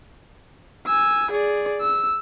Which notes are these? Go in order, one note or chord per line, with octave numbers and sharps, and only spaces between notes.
G#5 E6
G#4 D5
E6